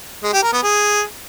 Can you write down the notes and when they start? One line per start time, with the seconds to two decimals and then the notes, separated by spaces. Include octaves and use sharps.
0.23 G#3
0.33 G4
0.43 A#4
0.53 B3
0.63 G#4